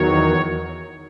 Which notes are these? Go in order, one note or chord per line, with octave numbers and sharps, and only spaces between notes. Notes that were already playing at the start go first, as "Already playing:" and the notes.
Already playing: E2 D#3 F#3 C#5